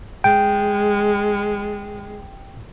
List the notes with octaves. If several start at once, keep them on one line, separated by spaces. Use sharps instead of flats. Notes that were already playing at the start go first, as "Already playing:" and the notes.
G#3 G5